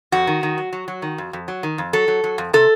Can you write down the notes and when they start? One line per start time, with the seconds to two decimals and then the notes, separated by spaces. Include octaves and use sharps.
0.12 F2 F#4
0.27 D#3
0.43 D#3
0.58 F#3
0.73 F#3
0.88 F#3
1.02 D#3
1.18 F2
1.33 F2
1.48 F#3
1.63 D#3
1.78 F2
1.93 F#3 A4
2.08 F#3
2.24 F#3
2.38 F2
2.53 C3 A4